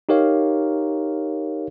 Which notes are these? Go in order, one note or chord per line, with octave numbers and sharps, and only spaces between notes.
D#4 G4 A#4 C#5 F5